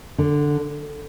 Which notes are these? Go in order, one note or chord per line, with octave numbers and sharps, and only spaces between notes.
D3